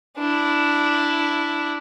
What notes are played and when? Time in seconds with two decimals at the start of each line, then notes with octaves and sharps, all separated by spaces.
0.18 D4 E4